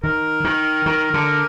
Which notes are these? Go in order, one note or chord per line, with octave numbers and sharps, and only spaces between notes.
D#3 A#4
D#3
D#3
D3